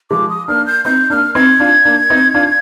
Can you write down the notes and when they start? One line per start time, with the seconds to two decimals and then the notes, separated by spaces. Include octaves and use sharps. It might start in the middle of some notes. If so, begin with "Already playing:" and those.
0.11 F3 G#3 D6
0.30 D#6
0.48 A#3 D4 F6
0.66 G6
0.85 C4 D#4 G6
1.10 A#3 D4 F6
1.35 C4 D#4 G#6
1.60 D4 F4
1.85 A#3 D4
2.10 C4 D#4
2.34 D4 F4